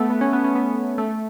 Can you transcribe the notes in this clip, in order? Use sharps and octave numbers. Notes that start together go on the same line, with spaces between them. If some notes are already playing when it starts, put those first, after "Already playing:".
Already playing: A3 B3
B3
C#4
B3
C#4
B3
A3